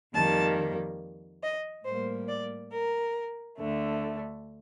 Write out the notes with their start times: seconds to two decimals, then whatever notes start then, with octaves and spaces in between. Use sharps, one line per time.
0.14 F2 D#3 G3 A#3 A5
1.43 D#5
1.85 A2 G3 A#3 C5
2.28 D5
2.71 A#4
3.58 D2 D3 A3